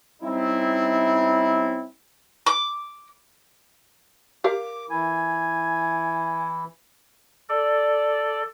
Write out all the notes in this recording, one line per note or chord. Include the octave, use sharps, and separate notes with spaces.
G3 C4 C#4 D#4 E4
D6
G4 A#4 F5 D6
E3 E4 G#5
A4 D5